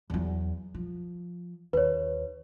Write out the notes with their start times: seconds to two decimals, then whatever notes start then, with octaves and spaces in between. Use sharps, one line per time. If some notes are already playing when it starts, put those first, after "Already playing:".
0.10 E2 F#3
0.74 F3
1.73 D#2 B4 C#5